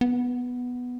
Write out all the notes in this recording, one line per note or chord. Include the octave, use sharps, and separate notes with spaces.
B3